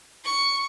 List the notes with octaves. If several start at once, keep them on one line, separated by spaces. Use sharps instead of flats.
C#6